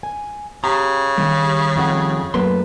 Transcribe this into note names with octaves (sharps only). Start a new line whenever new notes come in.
G#5
C#3 G4 A#5
D#3 G3
F2 D#4 F#5
F#2 F#3 A3 A#3 B4 C6